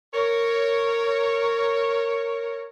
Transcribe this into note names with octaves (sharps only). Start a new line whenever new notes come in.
A#4 C#5